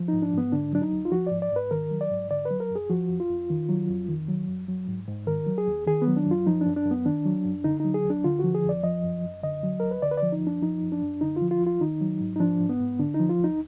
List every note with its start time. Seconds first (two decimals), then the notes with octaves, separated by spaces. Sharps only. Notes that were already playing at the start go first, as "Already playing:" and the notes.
Already playing: F3
0.08 G#2 D#4
0.22 D4
0.33 G#2 B3
0.52 D3 D4
0.73 F#3 D4
0.82 D#4
0.92 D2
1.05 F4
1.12 F3 F#4
1.27 G#2 D5
1.42 D5
1.51 G#2 B4
1.71 D#3 A#4
1.91 F#3
2.01 D5
2.11 G#2
2.31 D3 D5
2.45 B4
2.51 F#3
2.60 A#4
2.71 F#2 G#4
2.89 F3 F#4
3.09 F2
3.20 F4
3.30 F2
3.50 D#3
3.69 F#3
3.90 F2
4.09 D#3
4.28 F#3
4.48 F#2
4.68 F#3
4.88 G#2
5.08 G#2
5.27 D#3 A#4
5.47 F#3
5.58 G#4
5.67 D#2
5.87 D#3 G#4
6.02 B3
6.07 F#3
6.16 D4
6.26 F#2 F4
6.46 F3 D#4
6.61 F#2 D4
6.76 D4
6.86 F#2 B3
7.06 D#3 D4
7.26 F#3
7.45 F#2
7.65 D3 D#4
7.80 F#3 D#4
7.94 G#4
8.05 D2
8.10 D4
8.24 D3 F4
8.39 F3 F#4
8.55 G#4
8.64 F2 D5
8.84 F3 D#5
9.04 F#2
9.24 F#2
9.43 D3 D#5
9.63 F#3
9.80 D2 A#4
9.91 B4
10.02 D3 D5
10.11 B4
10.17 F3 D5
10.32 D#4
10.42 F#2 D4
10.62 F3 D#4
10.82 F#2
10.92 D4
11.02 F#2
11.21 D3 D#4
11.36 F4
11.42 F3
11.51 F4
11.61 D#2
11.67 F4
11.81 D#3 D#4
12.01 F#3
12.20 G#2
12.36 D#4
12.40 F3 D4
12.60 G#2
12.69 B3
12.80 G#2
13.00 D3 D4
13.14 F3 D#4
13.29 F4
13.39 D2 D#4